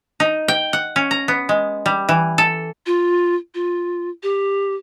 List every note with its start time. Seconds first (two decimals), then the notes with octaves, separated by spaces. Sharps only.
0.20 D#4
0.48 G5
0.73 F#5
0.96 C#4
1.11 A#5
1.28 B3
1.49 G#3
1.86 G3
2.09 E3
2.38 A4
2.86 F4
3.55 F4
4.23 G4